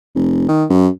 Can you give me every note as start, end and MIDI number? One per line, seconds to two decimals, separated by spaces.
0.15 0.45 29
0.48 0.64 51
0.70 0.88 42